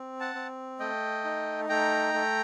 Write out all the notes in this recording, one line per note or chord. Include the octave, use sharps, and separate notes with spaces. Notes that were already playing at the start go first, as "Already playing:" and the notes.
Already playing: C4
F#5 A5
C4
A3 D#5 G5
D#4
A3 G5 A#5
A3